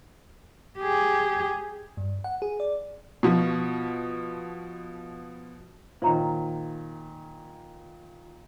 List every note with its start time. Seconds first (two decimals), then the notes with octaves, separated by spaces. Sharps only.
0.78 G4 G#4
1.97 G2
2.24 F#5
2.42 G#4
2.60 D5
3.23 B2 F3
6.02 A#2 D#3 C5 C#5 A#5